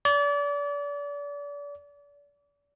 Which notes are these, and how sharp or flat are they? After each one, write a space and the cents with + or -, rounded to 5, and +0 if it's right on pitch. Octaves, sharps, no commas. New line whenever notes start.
D5 -35